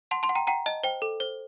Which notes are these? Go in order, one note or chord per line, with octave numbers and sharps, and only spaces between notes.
F#5 A5 C6
A5 C6
F#5
G5 A#5
F#5 G5 A#5
D#5 A5
C5 G5
A4
C5